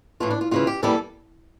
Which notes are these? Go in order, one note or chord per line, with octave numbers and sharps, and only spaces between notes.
A2 E3 A3 F4
D4
F4
D2 C#3 E3 F4
G4
E2 E3 G3 A#3 A4